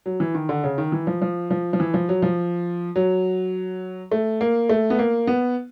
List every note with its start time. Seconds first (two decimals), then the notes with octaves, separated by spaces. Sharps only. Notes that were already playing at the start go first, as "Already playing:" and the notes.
0.06 F#3
0.20 E3
0.35 D#3
0.49 D3
0.64 C#3
0.78 D#3
0.92 E3
1.07 F3
1.22 F3
1.51 F3
1.73 F3
1.80 E3
1.94 F3
2.09 F#3
2.22 F3
2.96 F#3
4.12 A3
4.41 A#3
4.69 A3
4.90 B3
4.99 A#3
5.27 B3